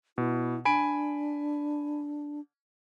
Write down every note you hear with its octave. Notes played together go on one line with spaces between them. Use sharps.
B2 E4
D4 G#5 B5 D7